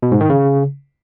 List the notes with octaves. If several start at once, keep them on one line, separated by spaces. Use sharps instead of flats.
B2
G#2
D#3
C#3